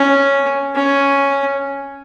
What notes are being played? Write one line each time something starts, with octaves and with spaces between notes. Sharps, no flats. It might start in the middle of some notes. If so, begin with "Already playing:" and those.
Already playing: C#4
C#4